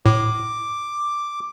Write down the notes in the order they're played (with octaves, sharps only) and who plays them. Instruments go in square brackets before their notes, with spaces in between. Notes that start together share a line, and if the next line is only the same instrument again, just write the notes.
[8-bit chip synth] A2 [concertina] D6